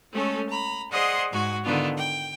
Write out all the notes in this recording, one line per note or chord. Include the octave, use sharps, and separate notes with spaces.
G#3 A3 C#4 A4
A#5 B5
G#4 C5 D5 D#5 F#5 C6
G#2 F#4 G#5
D3 D#3 B3 D4 F4
G5